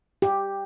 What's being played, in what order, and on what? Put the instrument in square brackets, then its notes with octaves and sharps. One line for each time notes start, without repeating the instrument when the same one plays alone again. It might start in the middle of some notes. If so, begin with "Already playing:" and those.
[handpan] G4